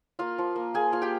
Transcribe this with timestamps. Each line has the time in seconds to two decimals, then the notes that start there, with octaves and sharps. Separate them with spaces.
0.19 A#3 F4 F5
0.38 F3
0.56 A#3
0.74 A#3 G#4 G#5
0.92 F3 F5
1.02 G4 G5